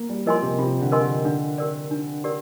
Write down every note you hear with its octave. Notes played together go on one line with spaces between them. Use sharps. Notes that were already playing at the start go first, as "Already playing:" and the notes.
Already playing: A#3
G3
F3 A#4 D#5 G#5 C6
C3
C3 F4
D3
A#4 D#5 G#5 C6
D3
D3 D4
G4 A#4 D5
D4
G4 A#4 D5